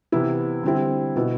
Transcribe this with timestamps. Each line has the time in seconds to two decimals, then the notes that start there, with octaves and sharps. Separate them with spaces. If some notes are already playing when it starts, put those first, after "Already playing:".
0.12 C3 E3 B3 E4
0.63 D3 G3 C4 E4
1.16 B2 B3 E4